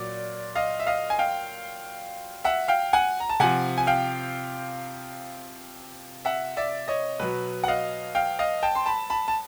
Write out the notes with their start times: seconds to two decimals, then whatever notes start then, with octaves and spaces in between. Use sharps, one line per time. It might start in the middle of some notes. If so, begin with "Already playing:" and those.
Already playing: A#2 F#3 D5
0.55 D#5 F5
0.80 E5
0.87 D#5 F5
1.10 G#5
1.19 F5 G5
2.45 E5 F#5
2.68 F5 G5
2.93 F#5 G#5
3.20 A#5
3.29 A5
3.40 C3 F3 F#5 G#5
3.78 G#5
3.87 F5 G5
6.25 E5 F#5
6.57 D5 E5
6.88 C#5 D#5
7.20 B2 F#3 B4
7.64 F#5
7.68 D#5 F5
8.15 F5 G5
8.39 D#5 F5
8.62 G5 A5
8.75 C6
8.86 A5 B5
9.10 A5 B5
9.28 A5